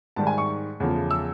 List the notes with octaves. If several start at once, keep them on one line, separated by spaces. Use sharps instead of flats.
G#2 D#3 G3 A5
G#5
C#6
E2 C#3 F3 A3
E6